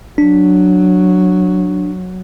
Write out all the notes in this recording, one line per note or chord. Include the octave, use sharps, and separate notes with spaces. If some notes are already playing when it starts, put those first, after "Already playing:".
F#3 D4